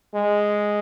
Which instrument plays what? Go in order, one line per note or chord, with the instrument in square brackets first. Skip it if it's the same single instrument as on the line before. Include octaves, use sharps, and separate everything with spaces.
[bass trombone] G#3